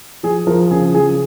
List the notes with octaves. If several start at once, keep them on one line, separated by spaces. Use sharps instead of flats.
F3 G#4
F3 A#4
C#3 G#4
F3 G#4